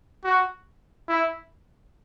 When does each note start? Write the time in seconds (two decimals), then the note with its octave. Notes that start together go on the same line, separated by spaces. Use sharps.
0.24 F#4
1.08 E4